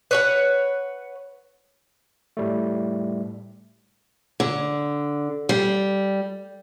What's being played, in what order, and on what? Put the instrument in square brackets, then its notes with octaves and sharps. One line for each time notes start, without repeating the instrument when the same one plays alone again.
[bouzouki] B4 C#5 F#5
[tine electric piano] A2 G3 A3
[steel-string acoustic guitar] D3
G3